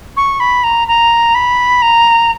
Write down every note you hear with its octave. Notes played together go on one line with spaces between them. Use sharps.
C#6
B5
A#5
A#5
B5
A#5